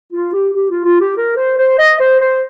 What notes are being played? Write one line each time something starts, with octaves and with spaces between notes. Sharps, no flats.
F4
G4
G4
F4
F4
G4
A#4
C5
C5
D#5
C5
C5